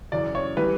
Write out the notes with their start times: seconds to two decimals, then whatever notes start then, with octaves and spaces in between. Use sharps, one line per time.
0.12 F#2 C#3 E3 D5
0.35 C#5
0.57 E3 G3 B4